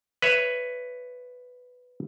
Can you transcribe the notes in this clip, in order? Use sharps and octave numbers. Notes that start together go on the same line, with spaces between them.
B4 C#5 E5